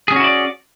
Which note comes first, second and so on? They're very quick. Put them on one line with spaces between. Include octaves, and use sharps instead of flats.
G#4 C#4 F#4 E4 D5